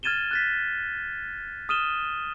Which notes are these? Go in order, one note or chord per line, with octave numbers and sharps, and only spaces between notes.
F6 G#6 A6 D#7 E7 G7
F#6 A6 B6
D#6 F6 D#7 E7 G7